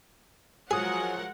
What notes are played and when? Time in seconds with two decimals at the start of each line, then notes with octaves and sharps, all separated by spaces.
0.71 F3 F#3 G#3 G#4 A#4 F#5 G#5 D#6